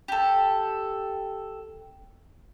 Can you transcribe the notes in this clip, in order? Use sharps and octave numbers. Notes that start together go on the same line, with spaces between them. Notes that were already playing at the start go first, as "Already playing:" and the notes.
G4 A4